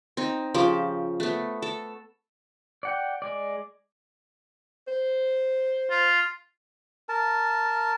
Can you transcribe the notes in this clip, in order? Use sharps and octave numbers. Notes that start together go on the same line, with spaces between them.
C4 D#4
C#3 F3 G4 D6
A3 B3
A4
D5 F#5 G5
G#3 D5
C5
F4
A#4 A5